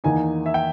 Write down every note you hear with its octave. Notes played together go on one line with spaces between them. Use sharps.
E2 D#3 A#3 D#4 G#5
E5
G5